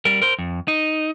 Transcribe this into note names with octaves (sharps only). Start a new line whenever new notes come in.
G3 A#4
A#4 C5
F2
D#4